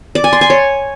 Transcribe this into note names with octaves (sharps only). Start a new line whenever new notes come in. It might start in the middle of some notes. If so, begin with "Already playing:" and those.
D5
G#5
C6
G#5
C#5